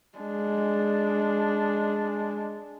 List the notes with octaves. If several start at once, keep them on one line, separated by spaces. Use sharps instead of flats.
G#3 D4